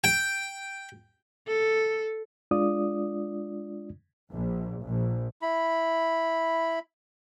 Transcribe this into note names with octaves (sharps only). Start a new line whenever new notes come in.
G5
A4
G#3 D4 F4 D5 D#6
A#1
A#1
E4 B5